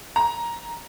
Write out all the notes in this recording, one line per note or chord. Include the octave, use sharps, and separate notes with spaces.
A#5